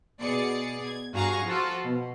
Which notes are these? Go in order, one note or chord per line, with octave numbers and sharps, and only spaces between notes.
B2 G#4 D5 C#7
G#6
G2 F#4 G#4 F5 A#5 C#6
F3 F4 F#4 A4 C5
B2